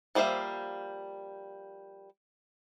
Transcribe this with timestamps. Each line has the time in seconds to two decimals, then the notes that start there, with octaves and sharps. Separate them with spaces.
0.15 F3 G3 A#3 C5 E5